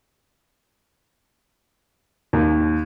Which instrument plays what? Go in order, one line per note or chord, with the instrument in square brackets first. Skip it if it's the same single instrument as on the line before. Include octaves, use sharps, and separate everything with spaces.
[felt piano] D#2